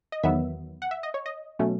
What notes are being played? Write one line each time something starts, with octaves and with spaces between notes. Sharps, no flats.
D#5
E2 D#3 F#3 B3 E5
F#5
E5
D#5
C#5
D#5
B2 F#3 A3 C#4